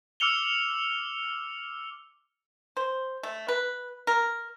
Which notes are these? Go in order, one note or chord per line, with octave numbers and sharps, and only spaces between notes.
D6 E6 F6 C#7 F7 G7
C5
A3
B4
A#4